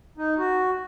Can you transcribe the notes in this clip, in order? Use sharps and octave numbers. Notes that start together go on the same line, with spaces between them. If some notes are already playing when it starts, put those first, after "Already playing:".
D#4
F#4